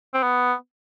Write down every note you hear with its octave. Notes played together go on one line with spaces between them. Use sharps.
C4
B3